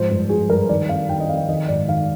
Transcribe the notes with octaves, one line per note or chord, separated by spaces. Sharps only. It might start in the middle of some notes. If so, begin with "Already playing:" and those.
Already playing: G#2 F3 C5
G2
F3 G#4
G2 A#4
D#3 D5
F2 F5
D#3 G5
D#5
F2 F5
D#3 D#5
G#2 D5
D#3 F5